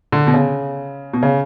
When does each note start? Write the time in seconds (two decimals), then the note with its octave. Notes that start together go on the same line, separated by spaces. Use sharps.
0.12 D3
0.27 B2
0.34 C#3
1.13 B2
1.23 C#3